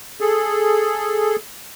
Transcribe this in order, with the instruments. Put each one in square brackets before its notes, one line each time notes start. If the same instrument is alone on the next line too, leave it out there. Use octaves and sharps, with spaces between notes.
[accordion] G#4 A4